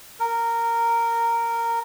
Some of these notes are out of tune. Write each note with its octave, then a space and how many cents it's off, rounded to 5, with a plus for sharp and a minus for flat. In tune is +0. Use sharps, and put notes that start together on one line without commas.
A#4 -10